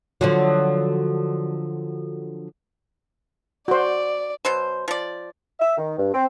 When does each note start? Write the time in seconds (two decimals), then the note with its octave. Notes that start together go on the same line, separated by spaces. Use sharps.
0.21 D3 F3 F#3
3.68 F#4 C5 D5
4.45 B2 F#3 C5
4.88 F3 D5
5.60 E5
5.77 D#3
5.98 G2
6.13 C4